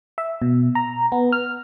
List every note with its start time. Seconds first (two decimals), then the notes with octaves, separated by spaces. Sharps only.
0.18 E5
0.42 B2
0.75 A#5
1.12 B3
1.32 F6